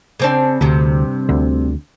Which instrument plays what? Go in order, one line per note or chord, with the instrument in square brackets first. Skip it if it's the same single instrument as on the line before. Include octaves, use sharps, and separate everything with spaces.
[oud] C#3 C4 D4
[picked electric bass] D2 [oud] G2 C3
[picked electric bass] D2 D3